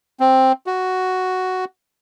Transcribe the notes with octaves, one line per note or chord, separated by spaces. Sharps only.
C4
F#4